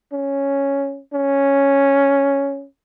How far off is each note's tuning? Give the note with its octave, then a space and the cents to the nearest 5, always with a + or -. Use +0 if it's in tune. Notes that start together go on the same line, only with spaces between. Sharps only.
C#4 +0
C#4 +0